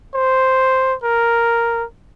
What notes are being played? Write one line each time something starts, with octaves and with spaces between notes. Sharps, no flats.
C5
A#4